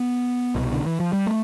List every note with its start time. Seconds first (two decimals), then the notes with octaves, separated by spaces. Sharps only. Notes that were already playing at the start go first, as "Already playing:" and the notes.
Already playing: B3
0.55 C2 B2
0.73 D3
0.86 E3
1.00 F3
1.13 G3
1.27 A3